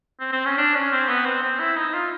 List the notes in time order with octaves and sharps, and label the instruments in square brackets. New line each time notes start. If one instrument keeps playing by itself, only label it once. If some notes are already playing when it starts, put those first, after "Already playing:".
[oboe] C4
C4
C#4
D4
C#4
C4
B3
C4
C4
E4
D#4
F4